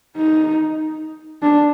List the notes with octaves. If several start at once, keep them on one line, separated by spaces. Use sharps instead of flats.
D#4
D4